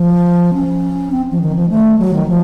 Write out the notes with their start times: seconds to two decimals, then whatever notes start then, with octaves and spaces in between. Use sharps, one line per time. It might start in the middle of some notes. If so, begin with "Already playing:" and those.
Already playing: F3
0.54 C#4
1.12 C4
1.31 F3
1.41 D#3
1.55 F3
1.69 A3
1.99 F#3
2.13 D#3
2.28 F3